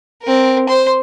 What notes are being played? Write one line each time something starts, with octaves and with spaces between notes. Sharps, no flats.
C4 A#4
C5 C6